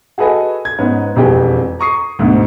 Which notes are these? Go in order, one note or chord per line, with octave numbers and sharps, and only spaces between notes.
F#4 G#4 A4 B4 D#5 G#5
G#6
G#2 B3 C#4
E1 F2 G4 G#4 G5
A#5 C#6 D#6 C7
D2 G#2 B2 D3